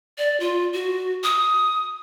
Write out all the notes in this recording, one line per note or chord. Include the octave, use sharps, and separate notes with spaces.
D5
F4
F#4
D#6